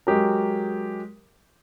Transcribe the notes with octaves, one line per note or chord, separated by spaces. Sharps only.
F#3 G#3 G4 A#4